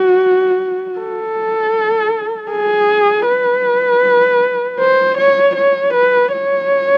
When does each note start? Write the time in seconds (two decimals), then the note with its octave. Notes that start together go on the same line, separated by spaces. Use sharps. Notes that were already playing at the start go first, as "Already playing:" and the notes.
Already playing: F#4
0.99 A4
2.51 G#4
3.28 B4
4.80 C5
5.18 C#5
5.56 C#5
5.94 B4
6.32 C#5